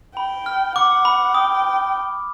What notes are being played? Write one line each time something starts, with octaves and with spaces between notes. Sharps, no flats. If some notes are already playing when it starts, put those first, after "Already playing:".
G5 B5
F6
F#5 D6
B5
G5 D#6